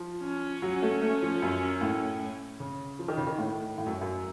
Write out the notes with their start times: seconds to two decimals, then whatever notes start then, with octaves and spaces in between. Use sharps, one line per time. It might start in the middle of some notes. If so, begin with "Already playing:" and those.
Already playing: F3
0.23 C#4
0.62 F#3
0.82 A3
1.02 A3
1.22 F3
1.42 F#2
1.81 A2
2.60 C#3
2.99 F3
3.08 D#3
3.17 C#3
3.27 D#3
3.39 A2
3.78 A2
3.86 F#2
4.01 F#2